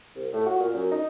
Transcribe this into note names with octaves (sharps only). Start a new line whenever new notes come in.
C2
A2
F#4
A#2
F#2
D#4